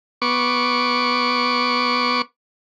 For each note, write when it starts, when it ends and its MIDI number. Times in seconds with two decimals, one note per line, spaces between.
0.22 2.22 59
0.22 2.22 85
0.22 2.22 86